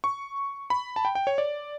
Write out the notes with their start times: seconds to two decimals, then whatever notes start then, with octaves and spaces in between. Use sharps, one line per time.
0.04 C#6
0.70 B5
0.96 A5
1.05 G5
1.15 G5
1.27 C#5
1.38 D5